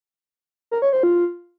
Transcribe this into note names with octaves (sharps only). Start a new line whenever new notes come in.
A#4
C#5
C5
F4